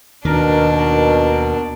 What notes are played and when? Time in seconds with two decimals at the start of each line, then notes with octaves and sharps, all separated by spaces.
0.25 D#2 B2 D#3 D4 A#4